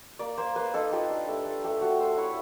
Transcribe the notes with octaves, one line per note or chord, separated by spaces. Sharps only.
A#3 D5
A#3 C5
A#3 B4
D#4 A4
F4 G4
D4
A3
A3
A3 G4
A3 F#4
A3 C5
E4 C#5